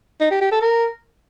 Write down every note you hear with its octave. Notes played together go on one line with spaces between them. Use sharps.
D#4
G4
G4
A4
A#4